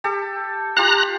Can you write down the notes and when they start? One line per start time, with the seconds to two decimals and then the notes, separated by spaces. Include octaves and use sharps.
0.04 G4 A4
0.77 F4 G4 F5 A#5 F#6